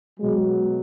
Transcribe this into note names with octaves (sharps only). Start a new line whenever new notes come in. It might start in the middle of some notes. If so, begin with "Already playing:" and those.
B2 F#3 G#3